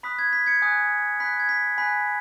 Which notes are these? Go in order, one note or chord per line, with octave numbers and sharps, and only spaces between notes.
B5 D#6 F#6 B6
G#6
B6
G#6 C#7
G#5 D#6 F#6
B5 F#6 B6
G#6
B6
G#5 B5 F#6 B6